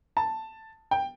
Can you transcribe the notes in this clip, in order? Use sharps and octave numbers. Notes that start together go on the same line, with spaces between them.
A5
G5